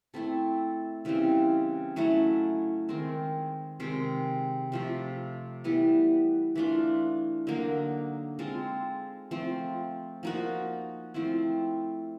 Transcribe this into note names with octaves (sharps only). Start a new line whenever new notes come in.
A3 C4 E4 A4
C#3 E3 G3 C4
F#3 A3 C#4 E4
D#3 G#3 C4
C3 D#3 G#3 C4
C3 F3 A3
E3 G3 B3 E4
E3 A3 D4 F4
D3 F#3 A#3 D#4
G#3 C4 F4 A4
F3 A3 C4
F3 A#3 D#4 F#4
F3 A3 C4 E4